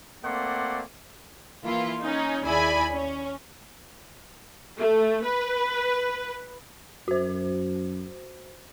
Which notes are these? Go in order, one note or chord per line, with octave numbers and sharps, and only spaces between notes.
A3 A#3 C4 D5 F#5 C6
E3 A#3 E4 F4
C#4 D#4
D#2 E4 G#4 D5 G#5 B5
C#4
A3
B4
F#2 F#4 C5